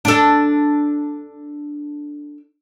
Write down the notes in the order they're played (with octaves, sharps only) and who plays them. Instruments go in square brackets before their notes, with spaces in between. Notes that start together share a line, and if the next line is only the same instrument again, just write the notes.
[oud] D4 A4